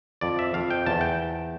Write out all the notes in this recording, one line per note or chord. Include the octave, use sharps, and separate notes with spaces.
F2 D5
E5
F2 F5
G5
E2 A5
G5